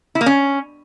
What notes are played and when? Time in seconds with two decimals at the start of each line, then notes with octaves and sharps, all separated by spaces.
0.15 E4
0.21 A#3
0.26 C#4